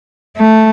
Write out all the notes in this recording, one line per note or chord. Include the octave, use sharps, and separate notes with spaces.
A3